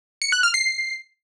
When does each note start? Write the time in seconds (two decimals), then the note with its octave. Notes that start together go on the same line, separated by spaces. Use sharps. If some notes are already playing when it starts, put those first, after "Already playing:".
0.22 C#7
0.32 F#6
0.43 F6
0.54 C7